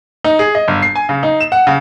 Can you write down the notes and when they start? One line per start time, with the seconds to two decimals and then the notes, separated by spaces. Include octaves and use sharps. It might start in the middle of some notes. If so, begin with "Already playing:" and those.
0.24 D#4
0.39 G#4
0.55 D#5
0.68 G1
0.82 C7
0.96 G#5
1.09 C#3
1.23 D#4
1.41 E7
1.52 F#5
1.67 C#3